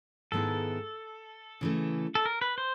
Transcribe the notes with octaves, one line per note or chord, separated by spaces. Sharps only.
G#2 D#3 G#3 B3 E4 A4
C#3 E3 A3
A4
A#4
B4
C5